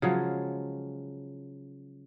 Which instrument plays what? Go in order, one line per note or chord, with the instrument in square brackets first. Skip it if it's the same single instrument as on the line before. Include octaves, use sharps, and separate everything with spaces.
[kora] C#3 F3 F#3 G#3